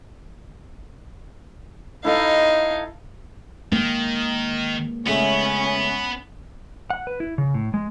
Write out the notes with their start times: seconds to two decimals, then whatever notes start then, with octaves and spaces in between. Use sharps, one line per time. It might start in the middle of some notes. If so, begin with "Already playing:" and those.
2.05 D#4 E4 A4 D#5 F5
3.72 D#3 G#3 A#3
5.06 C#2 A3 B3 C#4 E5
6.90 F#5
7.07 B4
7.20 E4
7.38 C#3
7.54 A2
7.74 G#3